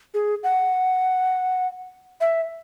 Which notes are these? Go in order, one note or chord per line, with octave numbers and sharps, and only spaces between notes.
G#4
F#5
E5